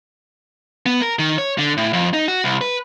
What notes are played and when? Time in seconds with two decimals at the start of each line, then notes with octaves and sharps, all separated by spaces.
0.86 B3
1.02 A#4
1.19 D#3
1.38 C#5
1.58 D3
1.77 A2
1.93 F2
2.13 D#4
2.28 F#4
2.44 C2
2.61 B4